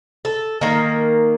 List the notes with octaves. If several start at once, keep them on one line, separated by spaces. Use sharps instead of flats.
A4
D#3 A#3